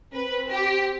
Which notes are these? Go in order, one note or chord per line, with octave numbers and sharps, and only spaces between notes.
C4 B4
G4